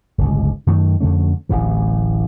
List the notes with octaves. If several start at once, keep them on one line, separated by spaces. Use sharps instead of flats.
D1 G1 C#2
F#2 D#3 A3
F2 D3 A3 C#4
D1 A1 A2 E3